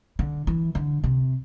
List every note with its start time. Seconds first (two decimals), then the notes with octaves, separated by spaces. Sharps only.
0.19 D3
0.47 E3
0.75 D3
1.04 C3